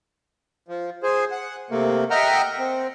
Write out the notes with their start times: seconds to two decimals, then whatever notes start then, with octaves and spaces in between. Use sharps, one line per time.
0.68 F3
1.03 G#4 C5
1.31 F#5
1.71 C3 A3 A#3
2.11 D#5 E5 F#5 G5 A#5 F6
2.59 C4